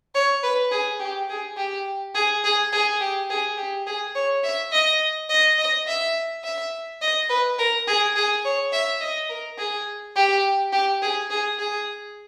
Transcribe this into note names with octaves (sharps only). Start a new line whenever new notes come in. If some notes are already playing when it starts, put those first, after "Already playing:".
C#5
B4
G#4
G4
G#4
G4
G#4
G#4
G#4
G4
G#4
G4
G#4
C#5
E5
D#5
D#5
D#5
E5
E5
D#5
B4
A#4
G#4
G#4
C#5
E5
D#5
A#4
G#4
G4
G4
G#4
G#4
G#4